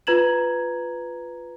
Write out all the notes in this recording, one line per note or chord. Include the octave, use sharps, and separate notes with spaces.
F4 B4 A#5 G#6 E7 F#7